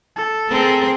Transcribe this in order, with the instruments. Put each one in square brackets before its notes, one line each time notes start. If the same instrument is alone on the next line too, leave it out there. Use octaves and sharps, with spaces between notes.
[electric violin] A4
[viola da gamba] C4 G#4 A#4